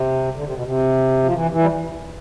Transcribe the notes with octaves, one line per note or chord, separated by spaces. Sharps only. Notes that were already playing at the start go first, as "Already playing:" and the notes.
Already playing: C3
D3
C3
B2
C3
F3
E3
E3
G3